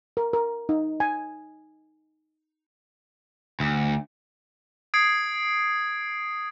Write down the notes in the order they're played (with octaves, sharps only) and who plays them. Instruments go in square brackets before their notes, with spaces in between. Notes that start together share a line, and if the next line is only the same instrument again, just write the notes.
[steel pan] A#4
A#4
D#4
G#5
[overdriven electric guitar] D2
[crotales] D#6 G#6 C7 D7